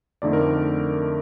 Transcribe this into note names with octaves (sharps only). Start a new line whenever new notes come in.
F2 D3 A3 D#4 D5
A#4